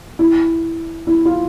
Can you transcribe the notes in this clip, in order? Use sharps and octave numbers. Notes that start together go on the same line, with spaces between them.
E4
E4
F4